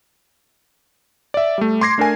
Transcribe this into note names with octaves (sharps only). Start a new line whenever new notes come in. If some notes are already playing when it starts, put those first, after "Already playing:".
D5 E5
G3 A3
C6 D6 G#6 A#6 C7
A3 D4 A4 A#4 G#5